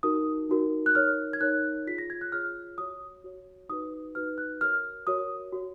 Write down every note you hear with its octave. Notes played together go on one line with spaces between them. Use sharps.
D#4 F#4 A#4 D#6
D#4 F#4 A#4
F#6
D#4 A#4 C#5 F6
G#6
D#4 A#4 C#5 F#6
F4 G#4 C#5 B6
A#6
G#6
F#6
F4 G#4 C#5 F6
F#4 C#5 D#6
F#4 C#5
D#4 F#4 B4 D#6
D#4 F#4 B4 F6
F#6
F#4 A#4 C#5 F6
F#4 A#4 C#5 D#6
F#4 C#5